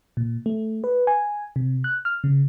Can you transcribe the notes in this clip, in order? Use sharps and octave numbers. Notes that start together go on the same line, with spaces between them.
A#2
A3
B4
G#5
C3
F#6
F6
C#3